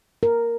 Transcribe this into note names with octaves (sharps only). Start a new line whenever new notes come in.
A#4